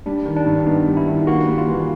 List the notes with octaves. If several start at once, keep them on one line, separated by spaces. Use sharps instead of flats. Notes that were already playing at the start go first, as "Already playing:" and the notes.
G3 D4
D#3
D4
G2
B3 D#4
G3
E4
D#3
A#3 F#4
G3
F4
E3